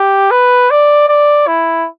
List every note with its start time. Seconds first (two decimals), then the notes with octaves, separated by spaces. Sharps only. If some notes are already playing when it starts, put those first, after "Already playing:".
Already playing: G4
0.31 B4
0.71 D5
1.09 D5
1.47 E4